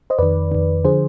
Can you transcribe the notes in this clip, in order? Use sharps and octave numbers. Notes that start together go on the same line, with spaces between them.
C5 D#5
F2 D#3 B4 D5
F2 D#3
D3 F3 G#4 C5